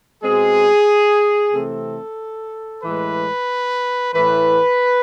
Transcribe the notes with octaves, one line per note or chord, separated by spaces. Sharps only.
B2 G#3 C4 G#4
C3 E3 A3 C4 A4
A2 E3 G#3 B4
A2 E3 A3 B4